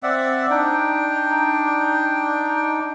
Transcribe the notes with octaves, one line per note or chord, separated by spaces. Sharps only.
C4 D5 E5 F#5
D4 D#4 G5